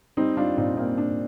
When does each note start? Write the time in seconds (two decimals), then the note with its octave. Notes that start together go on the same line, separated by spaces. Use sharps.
0.17 G3 C4 D#4
0.37 G3 D4 F4
0.57 A#2 C4 D#4
0.77 A#3 C4
0.98 A#3 D4